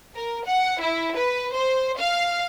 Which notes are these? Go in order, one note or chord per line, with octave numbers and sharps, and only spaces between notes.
A#4
F#5
E4
B4
C5
F5